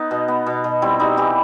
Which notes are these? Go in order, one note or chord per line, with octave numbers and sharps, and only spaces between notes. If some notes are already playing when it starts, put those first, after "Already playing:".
Already playing: B3 D#4
B2
B3
B2
B2
G3 C4 E4
G3 D#4 F#4
E3 E4 G4